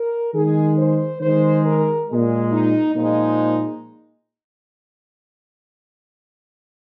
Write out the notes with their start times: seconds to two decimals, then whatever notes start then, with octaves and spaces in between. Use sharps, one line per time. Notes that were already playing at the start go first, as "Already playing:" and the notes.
Already playing: A#4
0.34 D#3 G#3 G#4
0.77 C5
1.21 D#3 G#3 C5
1.65 A#4
2.09 A#2 G#3
2.52 D#4
2.96 A#2 F3 G#3 D#4